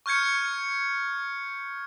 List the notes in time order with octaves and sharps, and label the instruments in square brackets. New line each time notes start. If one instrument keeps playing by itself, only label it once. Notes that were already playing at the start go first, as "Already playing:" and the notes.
[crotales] C#6 F6 G6 G#6 C#7